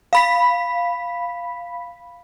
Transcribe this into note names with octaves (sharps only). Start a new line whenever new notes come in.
F5 B5 B6